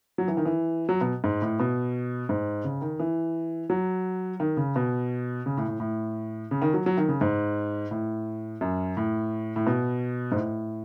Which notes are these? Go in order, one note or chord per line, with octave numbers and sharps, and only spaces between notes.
F#3
E3
D#3
E3
F#3
B2
G#2
A2
B2
G#2
C#3
D#3
E3
F#3
D#3
C#3
B2
C#3
A2
A2
A2
C#3
D#3
F#3
F#3
D#3
C#3
G#2
A2
F#2
A2
A2
B2
G#2
A2